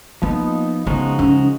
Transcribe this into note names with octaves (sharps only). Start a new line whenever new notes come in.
F3 A#3 B3 D#4
C#3 F3 G#3 B3 D#4 F#4
C#4